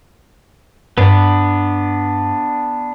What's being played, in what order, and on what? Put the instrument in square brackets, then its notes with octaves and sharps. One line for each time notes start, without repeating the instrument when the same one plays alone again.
[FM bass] G2 [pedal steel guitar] B3 D4